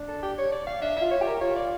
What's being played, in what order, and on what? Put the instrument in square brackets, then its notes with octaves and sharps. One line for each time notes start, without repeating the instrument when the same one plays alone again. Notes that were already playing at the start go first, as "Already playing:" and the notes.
Already playing: [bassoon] D4
[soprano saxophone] A4
G4
C#5
D5
F5
[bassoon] D4 [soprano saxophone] E5
[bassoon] F4 [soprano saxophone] E5
[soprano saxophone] C#5
[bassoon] G4
[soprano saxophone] A#4
[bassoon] F4 [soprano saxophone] C#5
[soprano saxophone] D5